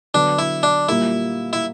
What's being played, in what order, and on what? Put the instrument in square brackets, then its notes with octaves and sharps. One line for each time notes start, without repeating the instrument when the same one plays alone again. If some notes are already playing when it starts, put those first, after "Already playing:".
[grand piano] D3 F#3 B3 [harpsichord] D4
[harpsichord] E4
D4
[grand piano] A#2 G3 A#3 [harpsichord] E4
[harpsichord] E4